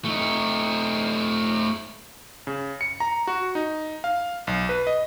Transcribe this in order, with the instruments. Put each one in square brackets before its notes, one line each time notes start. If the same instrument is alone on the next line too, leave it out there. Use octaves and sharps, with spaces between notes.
[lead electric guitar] A3 D#4
[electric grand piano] C#3
C#7
A#5
F#4
D#4
F5
B1
B4
D#5